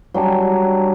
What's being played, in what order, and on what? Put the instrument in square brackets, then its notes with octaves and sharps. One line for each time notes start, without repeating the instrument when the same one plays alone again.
[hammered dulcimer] F#3 G3 D4 G#5